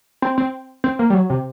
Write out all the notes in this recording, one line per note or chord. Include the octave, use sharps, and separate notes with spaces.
C4
C4
C4
A#3
G3
F#3
C3